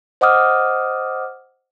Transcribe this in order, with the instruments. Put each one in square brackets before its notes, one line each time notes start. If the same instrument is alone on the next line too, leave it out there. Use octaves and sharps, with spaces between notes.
[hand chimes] C5 D#5 F#5 D6 D#6 F6